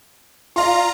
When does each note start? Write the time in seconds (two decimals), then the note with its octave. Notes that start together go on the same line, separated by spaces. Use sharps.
0.56 F4 D5 F5 A#5 C6